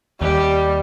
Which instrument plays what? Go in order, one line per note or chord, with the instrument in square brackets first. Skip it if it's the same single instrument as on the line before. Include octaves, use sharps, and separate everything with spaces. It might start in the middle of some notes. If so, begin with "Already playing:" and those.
[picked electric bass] D#2 [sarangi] G3 [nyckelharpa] G4